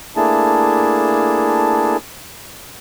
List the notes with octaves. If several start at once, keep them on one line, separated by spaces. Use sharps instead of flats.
A3 A#3 D4 E4 G#4 A5